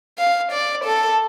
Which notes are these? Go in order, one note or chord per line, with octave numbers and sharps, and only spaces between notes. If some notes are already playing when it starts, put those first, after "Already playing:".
F5
D5
A4